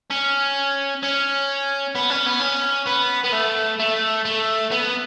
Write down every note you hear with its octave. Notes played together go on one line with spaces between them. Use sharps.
C#4
C#4
B3
C#4
B3
C#4
B3
B3
A3
A3
A3
B3